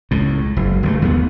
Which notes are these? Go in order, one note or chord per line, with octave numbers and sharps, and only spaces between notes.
C#2 A2
F#1
G1 C#3 A3
D#2 B3